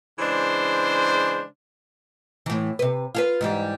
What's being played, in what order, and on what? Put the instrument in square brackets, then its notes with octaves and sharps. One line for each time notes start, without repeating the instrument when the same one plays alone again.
[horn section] C#3 E3 G#3 D4 C5
[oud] A2 E3
C3 B4
F4 G#4 B4
G#2 E3 G3